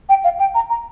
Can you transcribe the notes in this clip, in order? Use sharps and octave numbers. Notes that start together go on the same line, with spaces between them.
G5
F5
G5
A#5
A#5